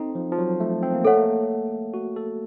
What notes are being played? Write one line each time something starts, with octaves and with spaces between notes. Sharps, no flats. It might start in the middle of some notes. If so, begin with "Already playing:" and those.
Already playing: C4 D#4 A4
F3
F3
F#3
A3
C4
A#3
A3 A4 C#5 F#5
A#3
F#4
A4